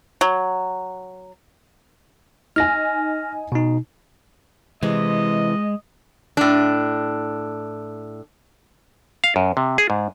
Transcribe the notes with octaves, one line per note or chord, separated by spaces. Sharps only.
F#3
D#4 G#5 F6 A#6
B2 D#4
C3 E3 G#3 D#5
A2 D4
F5
F#2
C3
G#4
G#2